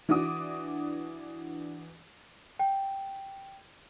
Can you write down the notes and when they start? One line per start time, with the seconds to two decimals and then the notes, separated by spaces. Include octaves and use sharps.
0.09 E3 D4 F#4 D6 D#6
2.59 G5